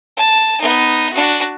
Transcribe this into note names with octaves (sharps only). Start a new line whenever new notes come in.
A5
B3 D#4
D4 F#4